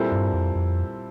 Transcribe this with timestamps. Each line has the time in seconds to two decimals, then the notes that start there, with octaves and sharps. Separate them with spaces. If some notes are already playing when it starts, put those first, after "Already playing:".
Already playing: A#2 G3 C4 E4 A4
0.12 G2
0.34 F2
0.55 F2